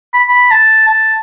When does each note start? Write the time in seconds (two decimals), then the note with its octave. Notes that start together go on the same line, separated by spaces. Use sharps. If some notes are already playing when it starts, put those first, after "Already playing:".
0.14 B5
0.29 B5
0.51 A5
0.89 A5